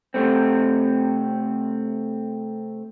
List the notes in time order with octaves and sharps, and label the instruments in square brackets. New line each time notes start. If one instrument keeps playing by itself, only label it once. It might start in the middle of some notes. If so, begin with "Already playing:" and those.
[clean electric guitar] C3 A3 C4